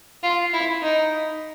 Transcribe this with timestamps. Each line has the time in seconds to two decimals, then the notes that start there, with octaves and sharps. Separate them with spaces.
0.23 F4
0.53 E4
0.83 D#4